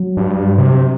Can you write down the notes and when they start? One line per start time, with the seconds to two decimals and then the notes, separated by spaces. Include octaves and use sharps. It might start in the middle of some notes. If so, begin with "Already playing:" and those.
Already playing: F#3
0.17 G2
0.58 C3